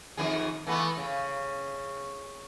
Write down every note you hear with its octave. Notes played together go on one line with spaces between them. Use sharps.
F2 D#3 G#4
E3 A3 B3
C#3